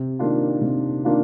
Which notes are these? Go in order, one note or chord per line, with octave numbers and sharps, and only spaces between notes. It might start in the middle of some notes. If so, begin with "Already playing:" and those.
Already playing: C3
D#3 A#3 D4 F4
C3
D#3 A#3 D4 F4